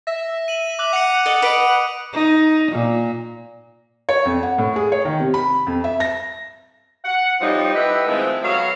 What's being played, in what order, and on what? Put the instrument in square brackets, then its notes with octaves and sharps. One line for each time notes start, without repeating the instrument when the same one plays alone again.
[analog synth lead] E5 [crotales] A#6
[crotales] D#7 F#7
D6 F#6 F#7
[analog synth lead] F#5 [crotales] C#7 F7
[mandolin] A4 D#5
[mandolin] B4 D#5 [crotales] D#6 D7
[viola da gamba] D#4
A#2
[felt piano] C#5
F2
F#5
A2
G#4
C#5
D#3
C3
B5
F2
E5
A#6
[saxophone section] F#5
A2 F3 G3 C4 D#4
E4 G4 B4 D#5 E5 F#5
D#3 F3 G#3 A3 C4 E4
F#3 B3 A4 C#5 F5